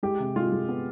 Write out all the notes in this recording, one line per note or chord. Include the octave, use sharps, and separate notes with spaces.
G#3 G4
C3
G#3 F4
G#3
B3